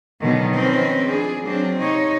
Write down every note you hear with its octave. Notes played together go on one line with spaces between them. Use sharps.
B2 D3 D#3 F#3
D#3 F3 C4 C#4 A#4 B4
F3 D4 G#4
F#3 A#3 C4 D4
C3 D#4 C#5